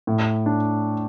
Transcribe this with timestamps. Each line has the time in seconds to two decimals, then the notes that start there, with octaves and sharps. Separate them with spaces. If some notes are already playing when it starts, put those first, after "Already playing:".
0.07 A2
0.46 D4